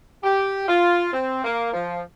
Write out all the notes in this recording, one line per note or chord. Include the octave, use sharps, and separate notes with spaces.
G4
F4
C4
A#3
F3